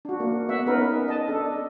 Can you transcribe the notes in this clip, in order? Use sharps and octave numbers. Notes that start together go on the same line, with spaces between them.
D4 F#4
A#3
B3 E5 F#5
B3 C#4 D#4 A#4 B4
D#5 A5
D4 A4